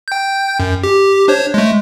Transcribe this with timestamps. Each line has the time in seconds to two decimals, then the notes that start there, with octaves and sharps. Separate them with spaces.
0.08 G5 G6
0.60 F#2
0.84 G4
1.28 D4 C5 C#5
1.54 G#3 A3